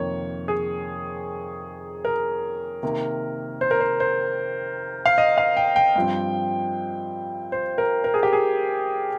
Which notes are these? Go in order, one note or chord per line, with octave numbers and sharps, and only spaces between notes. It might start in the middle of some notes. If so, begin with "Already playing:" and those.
Already playing: F2 C3 D#3 A#3 C#5
G#4
A#4
C3 D#3 A#3
C5
A#4
C5
C5
F5
D#5
F5
G5
G5
G2 F3 C4
C5
A#4
A#4
G#4
G4
G#4